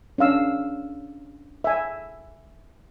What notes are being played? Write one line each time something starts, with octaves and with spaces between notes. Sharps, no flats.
C#4 D4 F5 E6
E5 G#5